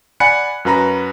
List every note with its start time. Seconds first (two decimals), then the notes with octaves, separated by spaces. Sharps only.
0.20 D5 F#5 G#5 B5 F#6 C#7
0.65 F#2 F#4 B4 A#5 B5